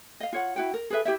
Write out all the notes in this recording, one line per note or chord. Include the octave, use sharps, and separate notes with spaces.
D#5 F5
F4 C#5 F#5
E4 F#4 G5
A#4
G#4 A4 B4 E5
E4 G4 C#5 E5